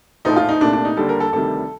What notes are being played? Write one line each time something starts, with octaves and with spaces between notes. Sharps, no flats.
A#1 A2 F3 A3 D#4
F4
D#4
C2 A#2 A3 D4
D4
D#4
D#2 D3 G3 A4
A#4
A4
D2 C3 D#3 G3 A4